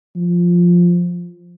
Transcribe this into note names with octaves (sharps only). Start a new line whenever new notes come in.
F3